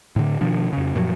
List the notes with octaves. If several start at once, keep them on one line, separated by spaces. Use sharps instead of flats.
A2 D3
B2 D#3 F3 D4
F2 C#3
F#2 A#2 F3 F#3